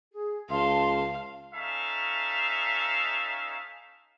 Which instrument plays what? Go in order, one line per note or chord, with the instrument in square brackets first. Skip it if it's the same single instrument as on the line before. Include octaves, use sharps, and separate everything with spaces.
[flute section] G#4
[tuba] C#2 [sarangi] F5 [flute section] A5 C6
[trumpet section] C#4 D#4 A4 E5 F5